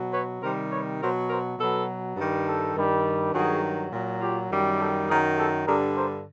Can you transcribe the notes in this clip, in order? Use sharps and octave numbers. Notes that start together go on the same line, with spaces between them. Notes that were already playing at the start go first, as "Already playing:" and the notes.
Already playing: B2 F#3
B4 C#5
C3 D#3 G3 A#4 C5
B4 C#5
B2 F#3 A#4 C5
A#4 C5
B2 F#3 A4 B4
G2 D#3 G3
G4 A4
G2 D#3 G3
G2 D#3 F#3 F#4 G#4
A#2 F#3
F4 G4
F#2 D#3 G3
G4 A4
F#2 D#3 F#3 G#4 A#4
G4 A4
G2 D3 G3 G#4 A#4
A#4 C5